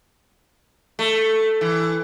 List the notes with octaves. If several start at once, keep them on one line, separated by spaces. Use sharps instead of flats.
A3
E3